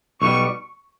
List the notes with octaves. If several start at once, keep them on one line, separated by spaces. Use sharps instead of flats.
B1 B2 G3 C#6